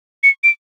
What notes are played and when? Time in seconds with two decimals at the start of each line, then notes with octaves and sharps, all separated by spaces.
0.23 C#7
0.44 D7